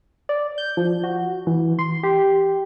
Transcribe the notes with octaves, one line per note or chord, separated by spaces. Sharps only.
D5
G6
F3
F#4
E3
C6
G4